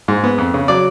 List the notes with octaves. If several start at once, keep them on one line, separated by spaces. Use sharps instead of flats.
G#2
B3
F2
C#3
F#3 D5